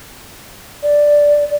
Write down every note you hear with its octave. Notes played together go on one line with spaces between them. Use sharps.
D5